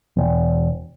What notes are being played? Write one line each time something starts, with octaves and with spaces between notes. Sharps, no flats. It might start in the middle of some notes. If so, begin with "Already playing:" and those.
E1